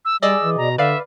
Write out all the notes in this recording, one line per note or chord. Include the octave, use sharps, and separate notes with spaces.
E6
G3 G#4 D5 D#5 E6
E3
B2 A#5
D3 B4 D5 E5 F5